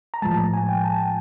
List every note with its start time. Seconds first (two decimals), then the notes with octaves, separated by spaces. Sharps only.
0.14 A#5
0.22 A2 F3 G#3 A5
0.54 G#5
0.69 G5
0.84 A5